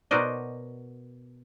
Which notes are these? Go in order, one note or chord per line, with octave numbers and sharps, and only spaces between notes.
B2 F#4 A#4 C5 D5 D#5